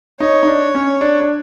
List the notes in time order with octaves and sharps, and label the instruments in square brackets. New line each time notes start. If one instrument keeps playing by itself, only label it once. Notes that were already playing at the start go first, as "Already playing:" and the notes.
[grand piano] D#4 [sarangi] C#5
[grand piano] D#4
D4
C#4
D4
D4